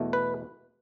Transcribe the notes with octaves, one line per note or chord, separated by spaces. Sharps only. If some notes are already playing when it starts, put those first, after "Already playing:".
Already playing: E2 B2 A3
B4